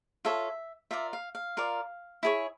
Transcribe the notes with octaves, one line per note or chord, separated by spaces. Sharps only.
F4 A4 C#5 E5
F4 A#4 D5 E5
F5
F5
F4 A#4 D5
E4 G#4 C#5